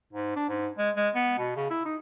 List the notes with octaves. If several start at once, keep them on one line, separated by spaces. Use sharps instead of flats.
G#2
D4
G#2
G#3
G#3
B3
B2
C#3
E4
D#4